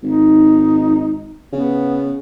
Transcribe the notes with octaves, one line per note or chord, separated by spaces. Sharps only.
G#1 D#4
C#3 B3